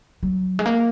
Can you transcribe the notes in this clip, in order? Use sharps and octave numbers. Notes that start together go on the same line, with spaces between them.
F#3
G#3
A#3